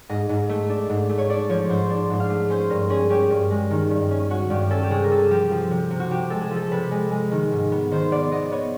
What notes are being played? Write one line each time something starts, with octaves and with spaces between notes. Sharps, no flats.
G#2 D#5
G#2
A3
D4
G#2
A3
C#5
D4 D5
F3 C#5
G#2 C5
D4
G#2
F5
A3
C#4 C5
G2 A#4
C#4 G#4
C#4 G4
G2
G#3
D#3
G2
C#4
C#4 F#4
G2 G4
C#4 A4
G4
C3 G#4
A#4
C3 A4
F3 G4
F3
C3
C3
F#4
C3 G4
G#3 A4
G#4
F3
A4
C3 B4
G#3
G#3
D#3
G#2
B3
D#3 C5
B3 D5
B3 D#5
B3 C#5